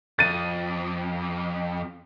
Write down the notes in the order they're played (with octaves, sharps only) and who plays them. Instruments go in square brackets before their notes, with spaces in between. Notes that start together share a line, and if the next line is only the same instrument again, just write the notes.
[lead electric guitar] F2 [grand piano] A6 D#7